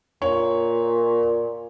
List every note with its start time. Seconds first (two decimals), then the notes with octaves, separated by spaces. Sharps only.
0.22 A#2 C#5